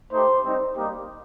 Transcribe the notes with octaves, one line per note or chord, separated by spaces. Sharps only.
A3 D#4 G4 C5
G3 C4 D#4
G3 A#3 D#4 G4